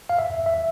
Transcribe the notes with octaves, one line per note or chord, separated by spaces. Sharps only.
F5
E5
E5